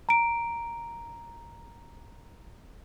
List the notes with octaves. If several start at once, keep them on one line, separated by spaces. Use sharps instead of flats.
A#5 D7